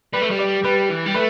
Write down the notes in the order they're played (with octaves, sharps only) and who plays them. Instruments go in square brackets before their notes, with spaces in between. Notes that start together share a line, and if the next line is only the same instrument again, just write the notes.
[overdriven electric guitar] G3 [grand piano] B4
[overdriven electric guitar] A3
G3
[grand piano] D5
[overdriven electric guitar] G3 [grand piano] B4
[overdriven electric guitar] E3
G3
[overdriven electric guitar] A3 [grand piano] B4